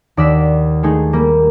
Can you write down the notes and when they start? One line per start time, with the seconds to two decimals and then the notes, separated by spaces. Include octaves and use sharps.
0.17 D#2 D5 F#5 E6 B6
0.83 G#3 A3 D#4 G#4
1.13 G3 A#3